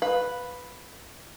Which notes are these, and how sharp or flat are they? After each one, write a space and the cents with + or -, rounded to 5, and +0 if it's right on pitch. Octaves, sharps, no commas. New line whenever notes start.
B4 +0 F5 +25